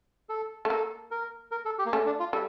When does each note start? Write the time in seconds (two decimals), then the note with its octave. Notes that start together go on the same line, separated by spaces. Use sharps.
0.29 A4
0.65 A3
0.70 A#3 A4
1.11 A#4
1.51 A#4
1.65 A4
1.79 G4
1.86 A#3
1.92 A3 C#4
2.06 D4
2.20 F4
2.33 G3 A4